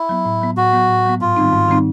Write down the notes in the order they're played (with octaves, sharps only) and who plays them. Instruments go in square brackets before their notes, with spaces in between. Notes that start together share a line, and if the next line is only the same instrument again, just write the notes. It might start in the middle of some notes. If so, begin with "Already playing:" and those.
Already playing: [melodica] E4
[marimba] F#3 B3
A2
F#3 B3
[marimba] A2 [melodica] F#4
[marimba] F#3 B3
A2
F#3 B3
[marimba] G#2 [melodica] F4
[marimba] D#3 G3 C4 D#4
G#2
D#3 G3 C4 D#4